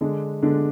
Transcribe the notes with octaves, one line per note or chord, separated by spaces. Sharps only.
D3 G#3 D4
D3 G#3 D4